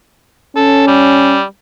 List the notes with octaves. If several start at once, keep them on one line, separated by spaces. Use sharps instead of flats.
C#4 A4
G3